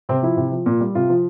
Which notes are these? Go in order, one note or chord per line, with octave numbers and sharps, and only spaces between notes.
C3 C4
F3 E4
C3
F3
A#2
G3
C3 F4
F3